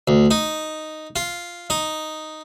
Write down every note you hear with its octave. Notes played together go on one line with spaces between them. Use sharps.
D2
D#4
F4
D#4